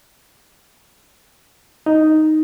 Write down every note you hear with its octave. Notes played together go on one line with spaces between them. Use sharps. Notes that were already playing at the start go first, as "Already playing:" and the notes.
D#4